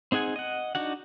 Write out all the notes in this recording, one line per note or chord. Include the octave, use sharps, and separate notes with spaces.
C4 D#4 G#4 F#5 G#5
D#5 F#5
D4 D#4 F#4 F#5